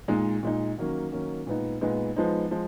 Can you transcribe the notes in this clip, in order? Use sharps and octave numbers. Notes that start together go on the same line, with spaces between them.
A#2 G#3 D#4
A#2 G#3 D#4
D#3 F#3 A#3 C#4
D#3 F#3 A#3 C#4
A#2 G#3 B3 D#4
A#2 G#3 B3 D#4
F3 G#3 B3 D#4
F3 G#3